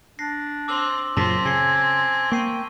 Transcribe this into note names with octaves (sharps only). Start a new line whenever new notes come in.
D4 A#6 C7
C4 D6 E6 F#7
F#2 A#2 C#3 C4 F4 A5 A#6 B6
C#3 G#5 E6 C7
A#3 G5 C#6 C7 D#7